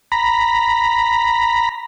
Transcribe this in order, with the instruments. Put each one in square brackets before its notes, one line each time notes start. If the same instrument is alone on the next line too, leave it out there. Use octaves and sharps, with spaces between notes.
[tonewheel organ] A#5 B5